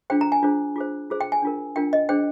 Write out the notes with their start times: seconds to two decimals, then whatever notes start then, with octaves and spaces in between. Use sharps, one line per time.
0.10 D4 F4 G#4 C5 G5
0.21 A#5
0.32 G#5
0.43 D4 F4 G#4 C5
0.76 F4 G#4 C5
1.10 F4 G#4 C5
1.21 G5
1.32 G#5
1.42 D4 F4 A#4
1.76 D4 F4 A#4 G5
1.93 D#5
2.09 D4 G#4 C5 G5